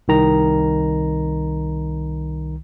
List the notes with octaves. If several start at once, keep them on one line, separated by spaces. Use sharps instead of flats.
C2 D#3 A#5